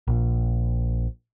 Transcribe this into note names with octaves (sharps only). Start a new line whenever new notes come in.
A#1